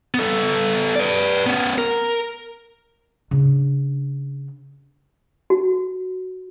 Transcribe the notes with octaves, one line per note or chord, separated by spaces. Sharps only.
B3 A4
B4 D5
B3 C#4
A#4
C#3 D4
F#4